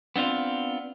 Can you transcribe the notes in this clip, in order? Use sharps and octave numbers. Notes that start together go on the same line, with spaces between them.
B3 C4 D4 F4